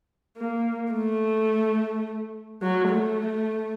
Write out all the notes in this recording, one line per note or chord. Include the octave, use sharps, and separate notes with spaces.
A#3
A3
F#3
A3